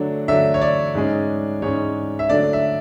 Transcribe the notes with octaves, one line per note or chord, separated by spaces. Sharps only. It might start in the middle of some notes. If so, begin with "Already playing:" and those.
Already playing: D3 F#3 A3 D4
D3 F#3 A3 D4 E5
C#5
D5
G#2 G#3 C#4
G#2 G#3 C#4 C#5
E5
D3 F#3 A3 D4 D5
E5